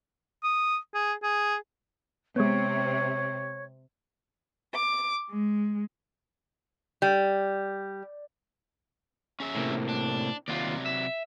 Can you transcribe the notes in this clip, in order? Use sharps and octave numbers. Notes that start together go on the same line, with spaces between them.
D#6
G#4
G#4
C3 G#3 B3 C#5
D6
G#3
G3
C#4 G#4 E5
A2 C3 A#3
D4
D#2 C3 F#3 F4 D5
E5